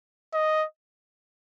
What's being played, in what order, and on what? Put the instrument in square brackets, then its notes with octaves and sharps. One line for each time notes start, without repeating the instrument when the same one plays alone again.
[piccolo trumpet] D#5